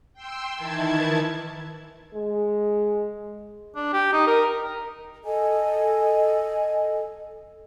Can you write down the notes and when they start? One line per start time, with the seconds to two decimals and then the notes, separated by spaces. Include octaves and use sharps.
0.14 G5 C6 E6
0.56 D#3 E3 E4 A5 G#6
2.14 G#3
3.75 D4
3.93 G4
4.13 D#4
4.27 A#4
5.24 A4 D#5 G#5